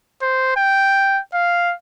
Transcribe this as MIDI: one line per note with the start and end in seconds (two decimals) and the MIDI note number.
0.22 0.55 72
0.56 1.20 79
1.34 1.74 77